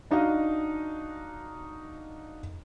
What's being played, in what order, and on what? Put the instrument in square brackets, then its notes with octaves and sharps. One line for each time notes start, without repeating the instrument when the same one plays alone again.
[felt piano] D4 D#4 F#4 D#5 F5